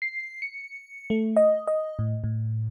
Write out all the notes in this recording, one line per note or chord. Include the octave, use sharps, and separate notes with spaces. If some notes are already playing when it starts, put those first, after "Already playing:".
C7
C#7
A3
D#5
D#5
A2
A2